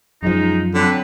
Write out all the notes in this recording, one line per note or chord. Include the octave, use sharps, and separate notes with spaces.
F#2 F3 G#3 D#4
D3 F#3 C4 B4